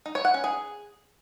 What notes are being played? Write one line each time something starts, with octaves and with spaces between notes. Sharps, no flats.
D#4
C#5
F#5
C#4
G#4